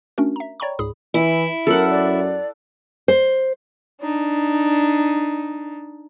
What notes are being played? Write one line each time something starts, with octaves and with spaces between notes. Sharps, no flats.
A3 C#4 D4 F#4 A#4
E5 A#5
C#5 D5 G5 A#5 B5 C#6
C#2 G#2 G#4 B5 D#6
E3 E4
F#2 A4 A#4 F#5
D5
C5
D4 D#4